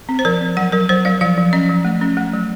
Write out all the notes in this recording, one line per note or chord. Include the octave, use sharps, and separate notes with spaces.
C4
C5
F3 A#4
C4
F#3 F#5
F#3 A#4
F#3 C5
F#3 F5
F3 F5
F3
C#4 D#5
F3
A3
C#4
A3
F#3